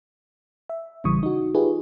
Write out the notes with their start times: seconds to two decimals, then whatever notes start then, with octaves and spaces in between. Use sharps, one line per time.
0.69 E5
1.04 A1 C#3 E3 G3 C#6 D#6
1.23 D#4 F#4
1.55 D#4 F4 G4 G#4 B4